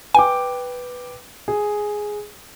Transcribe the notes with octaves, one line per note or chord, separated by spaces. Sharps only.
B4 G5 G#5 D6
G#4